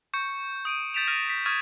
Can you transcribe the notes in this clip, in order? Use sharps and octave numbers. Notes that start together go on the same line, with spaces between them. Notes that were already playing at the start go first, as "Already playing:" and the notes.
C#6 G6 C#7
D#6 D7 D#7
G6 A6 B6 D7 E7 F7
F6 A6 A#6 D7 D#7 F7
B6
C#6 D#6 F6 G#6 A6 D#7